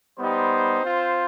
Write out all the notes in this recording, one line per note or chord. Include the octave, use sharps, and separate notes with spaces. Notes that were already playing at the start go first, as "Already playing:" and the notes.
G3 B3 D#4 G4 C5
C4 F4